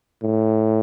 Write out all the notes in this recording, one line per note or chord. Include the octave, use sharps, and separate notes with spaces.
A2